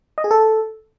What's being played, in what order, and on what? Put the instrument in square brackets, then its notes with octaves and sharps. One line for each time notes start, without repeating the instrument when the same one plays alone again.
[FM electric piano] D#5
G#4
A4